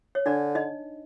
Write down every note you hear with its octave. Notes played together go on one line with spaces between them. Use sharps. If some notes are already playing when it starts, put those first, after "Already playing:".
C#5
D3 D4 D5
D#4 D#5